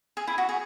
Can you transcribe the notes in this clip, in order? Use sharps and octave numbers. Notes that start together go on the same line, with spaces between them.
G#4
E4
F#4
G#4